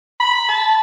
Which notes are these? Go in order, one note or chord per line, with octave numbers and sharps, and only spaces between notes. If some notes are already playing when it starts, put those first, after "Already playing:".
B5
A5